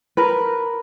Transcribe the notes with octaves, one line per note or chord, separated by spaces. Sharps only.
A#4 B4